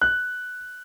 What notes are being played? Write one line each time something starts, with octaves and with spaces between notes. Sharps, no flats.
F#6